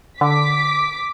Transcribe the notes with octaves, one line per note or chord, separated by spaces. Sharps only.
D3 D6 B6